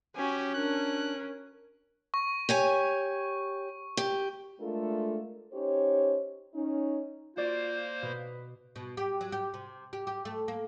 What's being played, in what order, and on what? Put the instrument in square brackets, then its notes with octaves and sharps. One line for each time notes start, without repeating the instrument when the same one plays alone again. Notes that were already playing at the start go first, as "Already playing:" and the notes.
[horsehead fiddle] C#4 [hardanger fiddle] F#4 G#5 [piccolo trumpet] G4
[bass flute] D4 [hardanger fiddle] A#4 [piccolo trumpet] F#6
[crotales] C#6
[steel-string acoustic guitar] G4 C#5 G#5
G4
[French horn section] G#3 A3 D4 F4 A4 A#4
C#4 D#4 G4 C5 C#5
C#4 D#4
[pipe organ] A#3 C5 [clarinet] F4 [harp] F#4 D5
[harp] B2 [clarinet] B4
[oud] B2
G4
F#3
G4
C3
G4
G4
A3
A#3